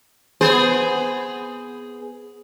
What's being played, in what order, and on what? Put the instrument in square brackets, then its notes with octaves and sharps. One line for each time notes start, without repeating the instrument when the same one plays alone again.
[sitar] B3 G#4 C5